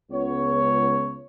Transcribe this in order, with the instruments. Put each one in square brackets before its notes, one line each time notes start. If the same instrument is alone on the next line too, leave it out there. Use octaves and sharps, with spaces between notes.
[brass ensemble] C#2 B3 C#5